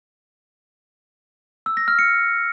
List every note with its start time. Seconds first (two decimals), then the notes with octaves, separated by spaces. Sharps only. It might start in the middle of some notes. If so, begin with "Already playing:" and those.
1.66 E6
1.77 A#6
1.88 F6
1.99 C#7